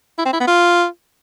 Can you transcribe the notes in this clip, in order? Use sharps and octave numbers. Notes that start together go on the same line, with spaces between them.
E4
C4
E4
B3
F4